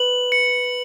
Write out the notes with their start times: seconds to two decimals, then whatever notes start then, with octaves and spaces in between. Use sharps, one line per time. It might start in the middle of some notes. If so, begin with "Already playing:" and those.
Already playing: B4 F#7
0.32 C#7